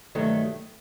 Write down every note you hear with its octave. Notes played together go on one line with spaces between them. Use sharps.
G2 D#3 F#3 A3